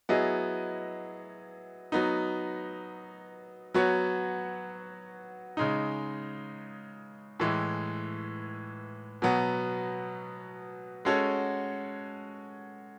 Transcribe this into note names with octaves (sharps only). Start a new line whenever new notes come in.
F#3 B3 E4 G#4 D#5
F#3 B3 D#4
F#3 B3 F#4 C#5
C#3 G#3 D#4
A2 E3 G#3
B2 F#3 B3
G#3 C#4 F#4 A4 C#5